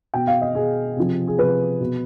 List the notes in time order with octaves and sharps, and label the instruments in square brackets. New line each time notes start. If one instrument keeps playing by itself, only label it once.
[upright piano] B2 G5
F5
D#5
B2 G#4
C3 F3
G#4
C3 F3 B4
B2